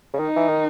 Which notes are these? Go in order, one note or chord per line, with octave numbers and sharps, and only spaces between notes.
C#3
D#3 D#4
E3
D#3